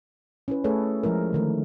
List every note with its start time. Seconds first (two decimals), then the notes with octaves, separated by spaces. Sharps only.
0.48 C#4 E4 B4
0.64 A3 G#4 A4 B4 C#5
1.03 F3 G#3 E4 A#4
1.33 D3 D#3 A3